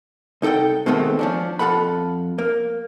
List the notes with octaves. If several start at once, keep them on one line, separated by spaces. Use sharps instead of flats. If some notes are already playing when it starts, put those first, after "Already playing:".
C2 D#4 A4 F#5 G5
B2 D#3 G#3 A3 B3 C4
F3 C#4 D4
F2 F4 A4 F#5 B5
A#3